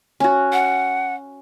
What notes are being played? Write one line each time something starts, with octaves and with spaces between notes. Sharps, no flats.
C#4 F#4
F#5